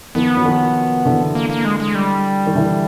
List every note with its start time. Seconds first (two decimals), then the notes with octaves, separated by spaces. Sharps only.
0.15 D#3 F3 B3
0.37 F#3
0.45 D#3 F3
1.06 D3 E3
1.35 A#3
1.50 A#3
1.65 G#3
1.80 G#3
1.95 G3
2.47 D#3
2.55 D3 E3